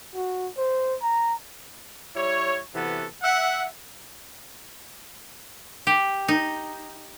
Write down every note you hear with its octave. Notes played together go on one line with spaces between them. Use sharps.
F#4
C5
A#5
G3 E4 C#5
C3 E3 B3 F#4 A4
E5 F#5
G4
D#4